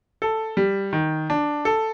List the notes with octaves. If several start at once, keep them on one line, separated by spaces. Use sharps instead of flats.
A4
G3
D#3
D4
A4